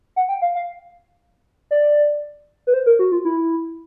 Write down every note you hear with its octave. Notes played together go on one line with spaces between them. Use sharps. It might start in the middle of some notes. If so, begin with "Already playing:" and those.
F#5
G5
F5
F5
D5
B4
C5
A#4
F#4
F4
E4